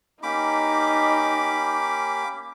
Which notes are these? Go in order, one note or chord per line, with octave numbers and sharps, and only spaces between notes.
A#3 C#4 D#4 G4 B5 D6